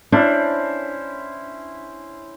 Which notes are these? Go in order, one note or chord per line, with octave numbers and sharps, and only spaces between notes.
C#4 D4 E4 C5